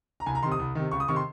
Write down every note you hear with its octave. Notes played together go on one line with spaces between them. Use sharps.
A#5
C2 G#5
A#5
C3 D#3 C6
D#6
C2
C3 D#3
C#2 C#6
D#6
C3 D#3 C#6
C6